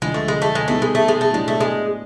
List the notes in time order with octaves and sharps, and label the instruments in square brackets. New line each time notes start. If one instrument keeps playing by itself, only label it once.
[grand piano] D2 D3 F3 [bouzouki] G#3
[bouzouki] A3
G#3
A3
G#3
[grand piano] B2 G3 B3 D#4 [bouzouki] A3
[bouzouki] G#3
A3
G#3
A3
[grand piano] A2 F#3 B3 D4 G4 [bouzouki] G#3
[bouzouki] A3
G#3